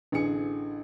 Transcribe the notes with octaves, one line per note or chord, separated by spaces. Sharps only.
A1 D3 G#4 C#7